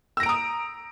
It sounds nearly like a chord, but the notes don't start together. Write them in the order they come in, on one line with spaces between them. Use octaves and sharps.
E6 A#6 D7 A#5 D#6